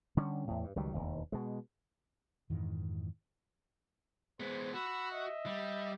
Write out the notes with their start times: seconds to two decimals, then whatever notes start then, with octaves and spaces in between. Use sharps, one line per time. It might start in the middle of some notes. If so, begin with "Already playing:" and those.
0.17 D3 G3 C#4
0.48 E2 A2
0.64 G2
0.76 C#2 D#3 F#3 G3
0.94 E1 D#2
1.32 B2 G#3
2.50 F2 G#2 D#3 E3
4.40 G#3 B3 C5
4.74 F#4 B5 E6
5.11 D#5 E5
5.46 G3